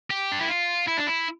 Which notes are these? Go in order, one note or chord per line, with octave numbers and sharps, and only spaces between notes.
G4
D4
E4
F4
E4
D4
E4